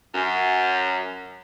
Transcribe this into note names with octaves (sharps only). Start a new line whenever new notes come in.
F#2